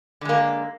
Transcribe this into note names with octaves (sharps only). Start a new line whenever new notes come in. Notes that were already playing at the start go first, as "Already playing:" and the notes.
D3 G#3 A#3